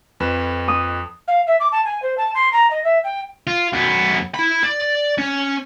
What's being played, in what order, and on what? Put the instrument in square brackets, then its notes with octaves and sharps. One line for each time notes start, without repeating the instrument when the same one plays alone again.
[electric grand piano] F2 B4 E7
[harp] D#6
[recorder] F5
E5
D6
A5
G#5
C5
A5
C6
A#5
D#5
E5
G5
[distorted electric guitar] F4
F#2 B3
E4 B5
D5
C#4